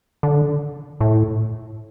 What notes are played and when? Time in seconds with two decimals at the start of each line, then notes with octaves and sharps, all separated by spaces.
0.23 D3
1.00 A2